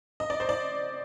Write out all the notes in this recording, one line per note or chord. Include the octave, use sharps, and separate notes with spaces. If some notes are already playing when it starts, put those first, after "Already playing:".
D#5
D5
C5
D5